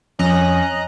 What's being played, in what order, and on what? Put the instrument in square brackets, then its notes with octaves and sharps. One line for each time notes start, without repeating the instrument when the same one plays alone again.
[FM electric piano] F2 [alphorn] C#4 [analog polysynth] D#5 A#5 F#6